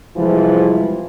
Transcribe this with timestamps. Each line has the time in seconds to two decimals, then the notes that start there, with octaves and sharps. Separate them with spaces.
0.16 C3 E3 F3 G3 G#3 E4